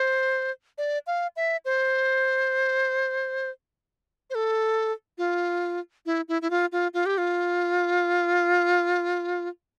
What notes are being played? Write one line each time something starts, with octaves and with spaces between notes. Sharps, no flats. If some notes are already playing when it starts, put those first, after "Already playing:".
Already playing: C5
D5
F5
E5
C5
C5
A4
F4
E4
E4
E4
F4
F4
F4
G4
F4